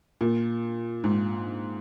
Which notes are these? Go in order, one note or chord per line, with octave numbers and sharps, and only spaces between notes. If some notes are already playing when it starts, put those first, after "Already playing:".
A#2
G#2